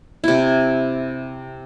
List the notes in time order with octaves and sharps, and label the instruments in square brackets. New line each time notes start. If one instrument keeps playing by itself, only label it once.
[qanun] C3 E4